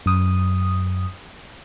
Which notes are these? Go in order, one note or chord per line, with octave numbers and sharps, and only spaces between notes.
F#2 D#6